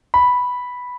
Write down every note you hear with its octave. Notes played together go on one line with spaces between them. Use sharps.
B5